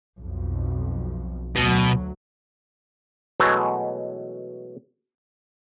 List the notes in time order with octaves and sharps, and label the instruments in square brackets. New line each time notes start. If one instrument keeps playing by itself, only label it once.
[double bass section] B1 F2
[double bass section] D2 F#3 [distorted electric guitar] B2
[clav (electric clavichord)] B2 E3 F#3 G#3 A3